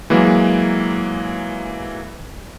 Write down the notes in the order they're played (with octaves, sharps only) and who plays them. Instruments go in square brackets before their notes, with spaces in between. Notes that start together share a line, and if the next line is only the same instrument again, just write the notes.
[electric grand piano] E3 F#3 G#3 A#3